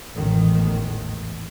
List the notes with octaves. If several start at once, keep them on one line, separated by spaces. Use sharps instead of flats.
A1 E2 G#2 D#3